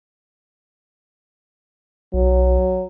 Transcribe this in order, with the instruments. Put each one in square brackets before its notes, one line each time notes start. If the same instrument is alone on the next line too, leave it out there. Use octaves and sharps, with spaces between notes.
[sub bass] B1 [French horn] F#3